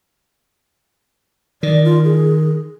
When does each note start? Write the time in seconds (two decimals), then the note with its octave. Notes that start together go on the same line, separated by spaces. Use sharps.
1.63 D#3 D5
1.84 F4
2.04 G#4